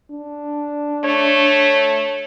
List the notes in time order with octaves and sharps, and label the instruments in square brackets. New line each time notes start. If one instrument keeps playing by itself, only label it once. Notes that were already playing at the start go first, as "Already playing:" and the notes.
[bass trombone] D4
[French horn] A3 [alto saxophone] C#5